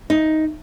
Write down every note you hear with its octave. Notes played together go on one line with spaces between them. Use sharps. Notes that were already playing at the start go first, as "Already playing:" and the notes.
D#4